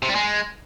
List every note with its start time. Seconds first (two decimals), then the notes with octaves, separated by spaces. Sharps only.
0.02 C3
0.09 G3
0.15 G#3